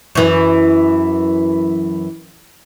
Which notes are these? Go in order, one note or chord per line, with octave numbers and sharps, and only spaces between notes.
F#2 E3